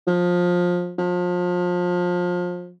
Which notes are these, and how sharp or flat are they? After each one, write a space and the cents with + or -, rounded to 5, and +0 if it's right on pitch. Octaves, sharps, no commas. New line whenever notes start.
F3 +20
F3 +30